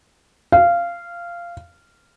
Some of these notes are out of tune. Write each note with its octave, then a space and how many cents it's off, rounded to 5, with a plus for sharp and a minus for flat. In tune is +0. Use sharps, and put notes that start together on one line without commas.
F5 -15